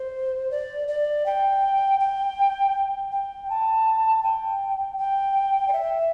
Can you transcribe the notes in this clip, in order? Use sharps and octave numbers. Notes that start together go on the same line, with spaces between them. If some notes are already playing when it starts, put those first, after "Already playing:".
Already playing: C5
D5
D5
G5
G5
G5
A5
G5
G5
D5
E5